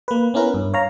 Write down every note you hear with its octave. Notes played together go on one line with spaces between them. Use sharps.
A#3 B4
B3 C#4 E4 A#4 B4
G2
C#5 F5 A#5